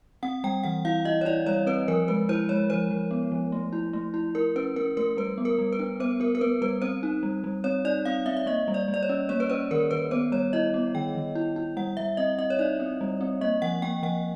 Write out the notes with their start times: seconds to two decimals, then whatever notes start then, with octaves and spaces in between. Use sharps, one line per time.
0.23 C4 F#5
0.44 G3 G5
0.64 E3 F#5
0.85 E4 F5
1.05 E4 D#5
1.21 C#5
1.25 E4 D5
1.46 G3 C#5
1.67 C4 B4
1.88 F3 A#4
2.08 G#3 B4
2.29 E4 C5
2.49 G#3 C#5
2.70 F3 C5
2.91 F3
3.11 B3
3.32 F3
3.52 A3
3.73 E4
3.93 A3
4.14 E4
4.35 E4 A#4
4.56 C#4 B4
4.76 C#4 A#4
4.97 A3 A#4
5.17 G3 B4
5.38 B3
5.45 A#4
5.58 G3
5.73 B4
5.79 D4
6.00 B3 C5
6.20 B3 A#4
6.35 A#4
6.41 B3 B4
6.62 G3 B4
6.82 C4 C5
7.03 D#4
7.23 G3
7.44 G3
7.64 C4 C#5
7.85 D#4 D5
8.05 C4 F5
8.26 C4 E5
8.37 E5
8.46 A#3 D#5
8.68 G3
8.74 D5
8.88 G3
8.94 D5
9.03 C#5
9.09 C#4
9.29 A#3 C#5
9.40 B4
9.50 C#4 C5
9.71 D#3 A#4
9.91 D#3 B4
10.11 B3 C5
10.32 G3 C#5
10.53 E4 D#5
10.74 B3
10.94 D#3 G5
11.15 D#3
11.35 E4
11.56 E4
11.77 G3 F#5
11.97 G3 E5
12.17 C4 D#5
12.38 C4 D#5
12.50 C#5
12.59 D#4 D5
12.80 C4
13.01 G3
13.21 C4
13.41 A#3 D#5
13.62 F3 F#5
13.82 A#3 G5
14.03 F3 F#5